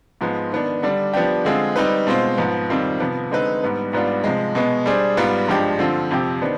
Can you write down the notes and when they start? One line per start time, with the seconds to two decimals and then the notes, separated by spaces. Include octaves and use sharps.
0.21 G#2 F3 G#3 B3
0.52 D#3 B3 D4
0.82 D3 G3 D4
1.14 F3 B3 D4 G4
1.45 D3 G#3 C4 F4 G#4
1.76 G3 C4 D#4 B4
2.07 B2 G#3 C4 F4 C5
2.38 G#2 F3 B3
2.69 F2 D#3 G3 C4 F4
3.00 C3 F3 B3
3.31 D3 G#3 C4 D#4 B4
3.62 G#2 G3 B3 D4
3.93 G#2 G3 B3 D4 F4
4.24 C3 F3 G#3
4.55 B2 G#3 B3
4.86 G3 D4 G#4 C5
5.17 G#2 G3 B3 F4
5.48 G2 F3 G#3 D4 G4
5.79 D3 F3 C4 F4
6.11 F2 C3 F3 C4 G4
6.41 D#3 B3 D4 C5